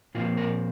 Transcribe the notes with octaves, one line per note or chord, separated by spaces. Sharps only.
A#2 F3 C4 F4
A#4